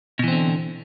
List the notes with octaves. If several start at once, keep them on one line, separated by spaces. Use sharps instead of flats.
B2 D3 E3 C4